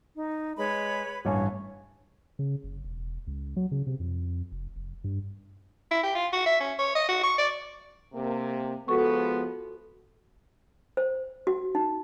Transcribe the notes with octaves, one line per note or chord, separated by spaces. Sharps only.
D#4
G#3 B4 C#5 B5
A1 G2 C#5 G#5
C#3
F#1
E1
C#2
F#3
C#3
C3
F2
F1
F1
G2
E4
G4
F4
F#4
E5
C#4
C#5
D#5
F#4
C#6
D5
C3 A#3
F3 G#3 B3 F#4 A4 C#6
C5
F#4
D#4